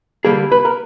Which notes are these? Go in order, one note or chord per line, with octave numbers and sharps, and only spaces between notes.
D3 G3 A#3 G#4
B4
A#4